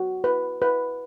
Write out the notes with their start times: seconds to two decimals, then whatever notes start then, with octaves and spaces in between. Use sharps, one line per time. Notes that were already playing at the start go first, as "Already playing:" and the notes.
Already playing: F#4
0.24 B4
0.62 B4